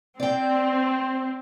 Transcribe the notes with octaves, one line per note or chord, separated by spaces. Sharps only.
C4 D5 G5